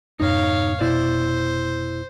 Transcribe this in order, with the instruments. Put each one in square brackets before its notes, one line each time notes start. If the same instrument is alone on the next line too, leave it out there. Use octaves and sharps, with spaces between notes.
[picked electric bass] F2 G#2 B2 [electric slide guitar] D#4 [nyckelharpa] C#5 F5
[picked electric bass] F1 B2 [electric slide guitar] E4 D5 [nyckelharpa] C5